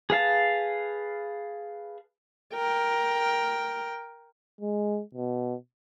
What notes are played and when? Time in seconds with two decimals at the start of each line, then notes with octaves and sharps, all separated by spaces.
0.10 G#4 B4 F5 A5
2.55 A#4 G5
4.61 G#3
5.15 B2